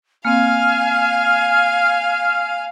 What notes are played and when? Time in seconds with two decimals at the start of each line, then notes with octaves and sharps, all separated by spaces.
0.25 A#3 C4 F5 G#5 F6